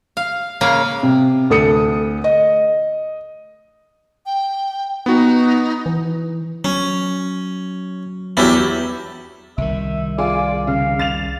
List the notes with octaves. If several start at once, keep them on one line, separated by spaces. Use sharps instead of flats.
F5
C#3 G#3 A#3 G#4 F5
C3
D2 A4 D#6 C#7
D#5
G5
B3 D#4 F#4
E3
F#3 C#4
E2 F#3 E4 G4
C2 D#3 E5
F4 G#4 D5 G#5
C#3 F5
A6 E7 F7